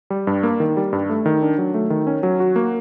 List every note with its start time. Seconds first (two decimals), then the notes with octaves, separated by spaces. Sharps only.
0.10 G3
0.27 G2
0.43 A#3
0.60 D#3
0.77 G3
0.93 G2
1.10 A3
1.26 D#3
1.42 D4
1.58 F#3
1.74 A3
1.90 D#3
2.07 C#4
2.23 F#3
2.40 F#4
2.56 A#3